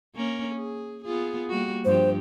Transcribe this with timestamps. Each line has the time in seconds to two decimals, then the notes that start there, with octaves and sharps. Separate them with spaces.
0.15 A#3 C#4 A#4
0.55 G#4
1.05 B3 F4 G#4
1.50 G3 A#3 F#4
1.85 G2 F3 G4 C5